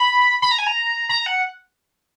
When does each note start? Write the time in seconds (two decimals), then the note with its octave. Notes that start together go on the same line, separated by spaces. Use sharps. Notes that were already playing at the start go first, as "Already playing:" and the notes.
Already playing: B5
0.42 B5
0.51 A#5
0.59 G#5
0.67 A#5
1.09 A#5
1.26 F#5